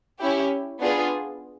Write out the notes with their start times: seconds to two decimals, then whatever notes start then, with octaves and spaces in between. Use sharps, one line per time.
0.20 C#4 E4 G4
0.80 B3 D4 F4 G#4